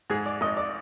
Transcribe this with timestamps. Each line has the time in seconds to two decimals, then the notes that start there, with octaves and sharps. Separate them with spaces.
0.10 G#2 G#4
0.26 D5
0.41 G#1 D#5
0.57 D5